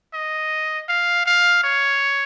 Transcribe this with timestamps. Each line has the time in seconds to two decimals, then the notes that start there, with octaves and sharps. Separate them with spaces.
0.14 D#5
0.89 F5
1.26 F5
1.64 C#5